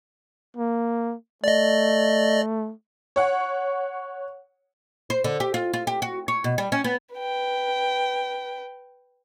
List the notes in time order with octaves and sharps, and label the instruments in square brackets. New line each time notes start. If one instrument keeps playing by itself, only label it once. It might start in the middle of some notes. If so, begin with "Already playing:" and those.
[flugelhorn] A#3
[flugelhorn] A3 [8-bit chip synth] D5 D#5
[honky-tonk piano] C#5 F#5
[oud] C5
D3
G4
F4
F4
G4
F#4
C#5
B2
G3
C#4
B3
[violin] B4 G5